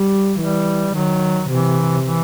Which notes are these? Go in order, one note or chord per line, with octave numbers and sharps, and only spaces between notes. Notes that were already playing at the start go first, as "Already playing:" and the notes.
Already playing: G3
E3 G3
D#3 F#3
C3 E3
E3